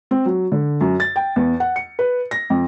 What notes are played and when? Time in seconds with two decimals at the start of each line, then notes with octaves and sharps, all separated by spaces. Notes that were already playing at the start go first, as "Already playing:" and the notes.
0.11 C4
0.26 F#3
0.52 D3
0.81 F#2
1.00 A6
1.16 G5
1.36 E2
1.60 F#5
1.76 C#7
1.99 B4
2.31 A#6
2.50 F2